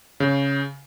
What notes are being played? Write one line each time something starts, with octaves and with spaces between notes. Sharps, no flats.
C#3